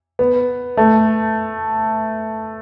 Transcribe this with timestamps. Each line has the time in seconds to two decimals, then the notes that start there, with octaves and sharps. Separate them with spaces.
0.19 B3
0.77 A3